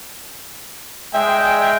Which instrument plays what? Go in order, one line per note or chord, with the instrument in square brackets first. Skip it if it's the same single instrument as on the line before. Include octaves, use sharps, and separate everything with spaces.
[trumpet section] G#3 G5 [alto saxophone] E5